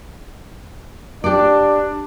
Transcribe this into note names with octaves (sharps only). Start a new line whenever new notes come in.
D4 G4 D5